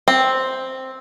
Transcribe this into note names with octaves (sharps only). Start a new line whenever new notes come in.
C4